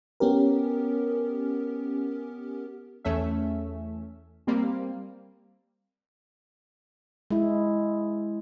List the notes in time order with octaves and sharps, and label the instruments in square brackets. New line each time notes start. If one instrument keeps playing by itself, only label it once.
[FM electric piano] B3 C#4 G4 A#4
[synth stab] E2 A3 C#4 E5
G3 A#3 C4
[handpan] G#3 E4